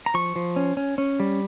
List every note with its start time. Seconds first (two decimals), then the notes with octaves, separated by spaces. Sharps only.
0.06 A#5
0.14 F3 C#6
0.36 F3
0.56 C#4
0.77 C#4
0.98 C#4
1.20 G3